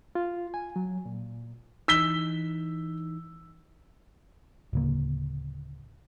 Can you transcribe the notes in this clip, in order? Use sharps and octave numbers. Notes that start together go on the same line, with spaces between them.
F4
G#5
F#3
A#2
E3 D#4 E6 B6 G7
D1 C#3 A#3